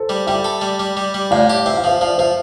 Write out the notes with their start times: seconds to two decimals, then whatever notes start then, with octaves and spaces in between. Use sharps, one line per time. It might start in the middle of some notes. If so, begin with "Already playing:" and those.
Already playing: A4 C5
0.09 G3
0.27 G3 E5 G5
0.44 A4
0.61 G3
0.80 G3
0.97 G3
1.14 G3
1.31 A2 D5 F5
1.50 G4
1.66 C4 E5
1.77 F5
1.84 F3 C5 E5
2.01 F3 D5 F5
2.18 F3 C5 E5